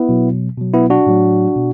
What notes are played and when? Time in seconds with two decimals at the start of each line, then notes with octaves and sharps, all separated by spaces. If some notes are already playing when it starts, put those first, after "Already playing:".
Already playing: B3 E4
0.09 B2 F#3
0.58 B2 F#3
0.74 B3 E4
0.90 D4 F#4
1.07 A2 F#3
1.56 B2